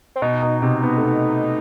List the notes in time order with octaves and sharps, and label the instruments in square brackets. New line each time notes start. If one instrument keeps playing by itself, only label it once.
[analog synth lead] C4
[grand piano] B2 [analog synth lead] D#4
[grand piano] B2
C3
B3
A3
B3